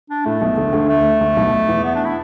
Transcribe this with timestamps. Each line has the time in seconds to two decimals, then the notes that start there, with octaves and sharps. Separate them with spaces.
0.10 D4
0.25 A2 A3
0.41 B1 B2
0.57 D2 D3
0.73 D2 D3
0.89 A3
1.21 D2 D3
1.37 B1 B2
1.69 E2 E3
1.84 B3
1.95 D4
2.05 E4